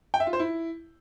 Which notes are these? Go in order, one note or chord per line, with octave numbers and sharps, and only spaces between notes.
G5
E5
F4
C5
E4